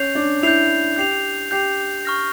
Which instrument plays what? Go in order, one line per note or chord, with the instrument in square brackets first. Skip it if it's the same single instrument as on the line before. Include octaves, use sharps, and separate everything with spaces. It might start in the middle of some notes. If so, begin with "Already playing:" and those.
Already playing: [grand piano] C#4 [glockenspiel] G6 C7 F7
[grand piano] D4
[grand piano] E4 [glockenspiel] G6 C7 F7
[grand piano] G4 [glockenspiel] G6 C7 F7
[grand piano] G4 [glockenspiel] G6 C7 F7
[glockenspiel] C#6 F6 A#6